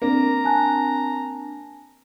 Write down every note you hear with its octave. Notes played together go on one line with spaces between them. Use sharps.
A#3 C4 D4 A#5
G#5 A5 F#6